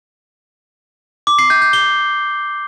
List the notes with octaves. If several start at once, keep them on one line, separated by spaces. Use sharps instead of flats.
D6
C7
G6
G6
G7